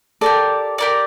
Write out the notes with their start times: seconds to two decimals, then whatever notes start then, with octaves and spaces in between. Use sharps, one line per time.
0.21 G4 A4 A#4 D5
0.78 G4 A#4 D5